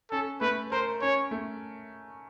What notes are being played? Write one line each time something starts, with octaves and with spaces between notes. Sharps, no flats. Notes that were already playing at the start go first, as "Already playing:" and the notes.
C#4 A4
A3 B4
A#4 C5
C#4 C#5
A3